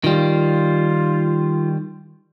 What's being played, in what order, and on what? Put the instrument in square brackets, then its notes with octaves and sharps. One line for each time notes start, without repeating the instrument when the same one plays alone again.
[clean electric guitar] D#3 G3 [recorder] F4